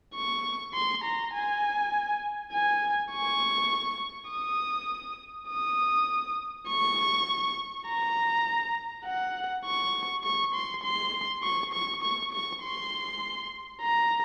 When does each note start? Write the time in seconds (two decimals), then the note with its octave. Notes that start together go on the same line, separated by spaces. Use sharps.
0.15 C#6
0.74 C6
1.04 A#5
1.34 G#5
2.52 G#5
3.12 C#6
4.30 D#6
5.49 D#6
6.69 C#6
7.87 A#5
9.06 F#5
9.65 C#6
10.24 C#6
10.54 C6
10.83 C6
11.43 C#6
11.73 C#6
12.02 C#6
12.32 C#6
12.63 C6
13.81 A#5